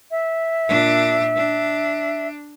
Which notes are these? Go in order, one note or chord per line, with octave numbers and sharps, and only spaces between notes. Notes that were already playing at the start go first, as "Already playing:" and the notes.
E5
A#2 D4
D4